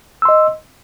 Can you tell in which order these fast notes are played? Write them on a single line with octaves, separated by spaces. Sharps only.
E6 C6 D#5